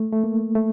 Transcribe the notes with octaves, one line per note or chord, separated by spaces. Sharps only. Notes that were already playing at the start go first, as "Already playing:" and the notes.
Already playing: A3
A3
A#3
A3